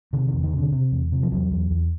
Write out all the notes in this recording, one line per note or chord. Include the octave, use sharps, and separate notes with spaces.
C3 D#3
D#3
E2
D#3
C3
D3
C3
E2
C3
F3
E2 F#3
E2
E2